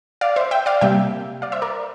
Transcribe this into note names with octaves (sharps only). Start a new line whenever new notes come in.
D5 F5
C5 E5
E5 G5
D5 F5
C3 G3 A#3 E5 G5
D5 F5
C5 E5
A#4 D5